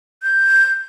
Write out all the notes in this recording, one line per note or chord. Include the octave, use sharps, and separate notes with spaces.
G6